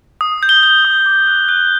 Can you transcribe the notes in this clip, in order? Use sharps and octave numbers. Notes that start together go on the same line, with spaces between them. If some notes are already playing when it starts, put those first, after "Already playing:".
D#6
G6
G7
G6
D#6
D6
F#6
F#6